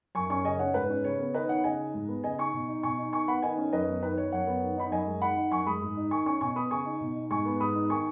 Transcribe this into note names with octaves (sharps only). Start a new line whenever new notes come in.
F#2 G#5 C#6
C#4 G#5 C#6
C#3 D#5 G#5
C#4 C#5 F#5
G#2 B4
C#4
C#3 C#5
B3
D#3 B4 D#5
D#4 C#5 F#5
C#3 D#5 G#5
D#4
G#2
B3
C#3 D#5 G#5
D#4 G#5 C#6
B2
D#4
B2 G#5 C#6
D#4
D#3 G#5 C#6
B3 F#5 B5
D#3 D#5 G#5
C#4
F#2 B4 D#5
B3
D#3 B4
D#4 C#5
F#2 C#5 F#5
B3
D#3
D#4 B5
F#2 D#5 G#5
G#3
D#3 F#5 B5
D#4
F#2 G#5 C#6
G#3 B5 D#6
G#2
D#4
D#3 G#5 C#6
C#4 G#5 C#6
B2 G#5 C#6
B3 B5 D#6
C#3 G#5 C#6
D#4
B2
D#4
G#2 G#5 C#6
B3
G#2 B5 D#6
D#4
D#3 G#5 C#6